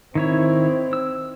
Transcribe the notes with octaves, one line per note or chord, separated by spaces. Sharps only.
D#3 C4 E4 C#5
E6